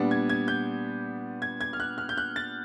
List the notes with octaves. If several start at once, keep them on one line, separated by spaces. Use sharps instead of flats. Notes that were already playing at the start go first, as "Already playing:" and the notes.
Already playing: A#2 G3 B3 D4
G#6
G#6
G6
G#6
G#6
F6
F#6
F6
G6
F#6
A6